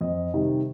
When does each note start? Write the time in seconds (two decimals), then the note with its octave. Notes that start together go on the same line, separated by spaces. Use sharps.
0.01 F2 D#5
0.34 C3 D#3 G3